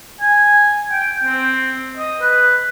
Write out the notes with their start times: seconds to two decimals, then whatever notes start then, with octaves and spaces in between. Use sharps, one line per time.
0.21 G#5
0.92 G5
1.24 C4
1.97 D#5
2.21 B4